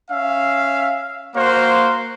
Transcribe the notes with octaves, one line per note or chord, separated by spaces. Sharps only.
C#4 E5 F5
A#3 F#4 C5 F5